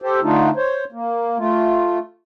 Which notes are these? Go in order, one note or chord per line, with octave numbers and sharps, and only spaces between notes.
G4 A4 C5
D3 A3 D4 D#4 F4
C5 C#5
A#3
A3 F4